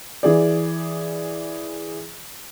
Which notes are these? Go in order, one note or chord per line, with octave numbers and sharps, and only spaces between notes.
E3 G#4 D5